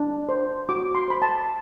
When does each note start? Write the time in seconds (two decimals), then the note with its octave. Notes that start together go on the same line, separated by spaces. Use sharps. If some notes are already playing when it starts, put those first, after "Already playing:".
Already playing: D4
0.29 C5
0.69 F#4 D6
0.95 C6
1.08 C5 B5
1.22 A5